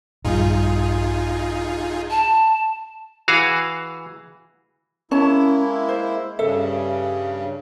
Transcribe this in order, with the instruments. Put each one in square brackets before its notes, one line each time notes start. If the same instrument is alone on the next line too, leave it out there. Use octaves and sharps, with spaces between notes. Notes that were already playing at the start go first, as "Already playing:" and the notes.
[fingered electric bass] A#1 G2 G3 [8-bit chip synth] D#4 F4 G#4
[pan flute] A5
[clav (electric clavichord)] E3 F#4 G#4 F5
[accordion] G#3 A#3 E4 [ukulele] C#4 C#5 A5
[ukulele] C5
[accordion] G2 C#3 [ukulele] A4 E5